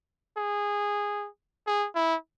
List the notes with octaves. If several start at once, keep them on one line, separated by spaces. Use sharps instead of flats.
G#4
G#4
E4